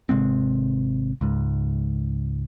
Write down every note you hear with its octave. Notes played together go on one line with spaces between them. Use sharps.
G#1 C3 G#3 C4
C#2 G#2